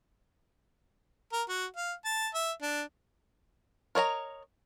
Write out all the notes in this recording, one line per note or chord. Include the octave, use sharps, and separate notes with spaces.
A#4
F#4
F5
A5
E5
D4
A#4 C#5 D#5 A#5